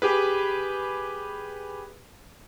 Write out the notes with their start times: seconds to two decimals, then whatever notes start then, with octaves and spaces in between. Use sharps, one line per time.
0.02 G4 G#4 B4